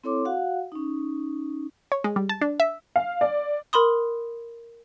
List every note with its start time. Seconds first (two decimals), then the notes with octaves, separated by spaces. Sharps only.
0.04 C4 E4 A4 C#5 C6 D6
0.25 F#4 F5 F#5
0.72 C#4 D#4
1.92 C#5
2.04 G#3
2.16 G3
2.29 A5
2.41 D4
2.60 E5
2.96 F5
3.21 D5
3.73 A#4 B5 C6 D#6